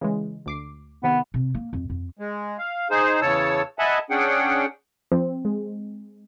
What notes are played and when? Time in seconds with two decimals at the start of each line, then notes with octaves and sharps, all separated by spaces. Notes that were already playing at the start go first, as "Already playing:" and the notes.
0.01 C#3 E3 G#3
0.46 D2 D6 C7
1.03 C3 D#3 B3
1.34 C3
1.55 A#3
1.73 F2
1.90 F2
2.19 G#3
2.59 F5
2.90 D#4 G#4 C5
3.22 E2 C#3 C#5 A5 E6
3.79 D#5 E5 F#5 G#5 A5 B5
4.10 C#4 D4 G#4 F#5 G5
5.12 F3 C4
5.45 G#3